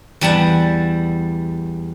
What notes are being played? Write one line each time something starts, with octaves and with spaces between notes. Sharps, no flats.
E2 G3 F#5 A5